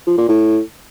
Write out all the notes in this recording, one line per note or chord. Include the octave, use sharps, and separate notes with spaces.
F3
A#2
A2